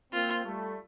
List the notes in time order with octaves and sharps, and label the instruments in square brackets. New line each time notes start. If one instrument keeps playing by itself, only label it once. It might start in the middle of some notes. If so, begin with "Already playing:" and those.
[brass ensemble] A#3 C4 [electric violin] F4
[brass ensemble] G3 A3